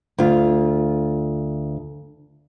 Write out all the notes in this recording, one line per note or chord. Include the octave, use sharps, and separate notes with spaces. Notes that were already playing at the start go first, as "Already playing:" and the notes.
D2 F4